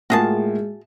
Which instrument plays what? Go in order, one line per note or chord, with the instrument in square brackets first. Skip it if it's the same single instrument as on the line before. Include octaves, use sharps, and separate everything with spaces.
[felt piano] A2 A#3 F4 [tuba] G#3 [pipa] F#4 G#4 A5